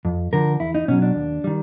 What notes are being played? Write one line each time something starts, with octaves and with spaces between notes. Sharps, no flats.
F2
D3 F3 A#4
E2 E4
D#4
B2 F#3 C#4
D4
D#2
D#3 G3